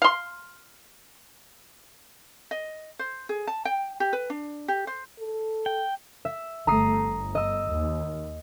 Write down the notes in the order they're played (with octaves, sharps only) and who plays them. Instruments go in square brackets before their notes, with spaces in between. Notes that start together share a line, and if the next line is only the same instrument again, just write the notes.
[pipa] F5 C6
[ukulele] D#5
C5
G#4
A5
G5
G4
B4
D4
G4
C5
[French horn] A4
[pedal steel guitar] G5
[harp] E5
[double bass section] G1 A3 [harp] A#5 D#6 C7
[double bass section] G1
[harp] D#5 E6
[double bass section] D#2